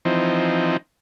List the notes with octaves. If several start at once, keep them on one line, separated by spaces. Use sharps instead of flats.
E3 F3 C4 D#4